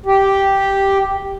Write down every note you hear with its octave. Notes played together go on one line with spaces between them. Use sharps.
G4